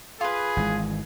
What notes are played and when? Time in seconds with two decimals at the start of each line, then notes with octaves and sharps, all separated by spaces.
0.21 F4 G#4 B4
0.57 G#1 E3 G#3